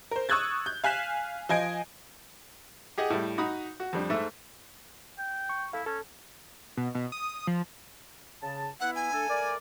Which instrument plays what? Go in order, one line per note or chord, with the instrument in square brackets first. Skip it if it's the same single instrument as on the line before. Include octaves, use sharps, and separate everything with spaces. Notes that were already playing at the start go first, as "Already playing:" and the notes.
[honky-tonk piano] A#4 C5
C#6 D#6 E6 F#6 G#6 A6
G6
F5 G#5 F#6 B6 E7
F3 D#5 G#5 G#6 D7
[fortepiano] G4 G#4 D#5 F#5
A2 G3
D#4 F#4 B5 D#6
F#4
F2 G3 D4
G#2 A3 E5
[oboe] G5
[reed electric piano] C#6
[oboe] E4 [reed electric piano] A4 F5
[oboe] C#4 [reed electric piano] A4
[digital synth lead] B2
B2
D#6
F3
[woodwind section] C#3 A5
[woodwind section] B3 E4 [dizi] F#5
[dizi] G#5
[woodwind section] A3 D4 A4
A3 A#4 D5